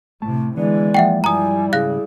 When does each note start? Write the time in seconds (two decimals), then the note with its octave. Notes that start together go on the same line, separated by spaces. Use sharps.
0.22 A2 C3 A3 A5
0.57 D3 E3 G#3 B3 D5
0.94 F3 A#3 E5 F#5 G5
1.24 G2 F3 G3 E4 G#5 A#5 D#6
1.73 G#2 C#3 G#4 F5 F#6 A#6